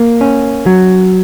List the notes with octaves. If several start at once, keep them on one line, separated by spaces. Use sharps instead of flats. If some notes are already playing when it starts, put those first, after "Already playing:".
Already playing: A#3
C#4
F#3